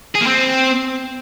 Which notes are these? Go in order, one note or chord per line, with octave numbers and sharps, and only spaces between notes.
G#4
A#3
C4